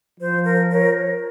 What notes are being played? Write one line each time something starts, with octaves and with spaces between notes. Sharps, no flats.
F3 C5
A#4
A#4 C#5